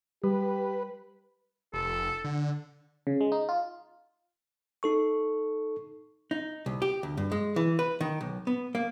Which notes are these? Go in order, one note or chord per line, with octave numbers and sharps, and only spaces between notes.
G3 G4 B4
F1 A4
D3
C#3
G#3
D#4
F4
D#4 A4 C#6
D#4
C2
G4
D2
G2
G#3
E3
B4
D#3
B1
B3
A#3